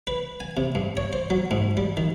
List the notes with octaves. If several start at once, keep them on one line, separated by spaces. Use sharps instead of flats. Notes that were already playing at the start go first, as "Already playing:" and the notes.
B4
G#5
C3
G2
C#5
C5
F#3
G#2
G3
D#3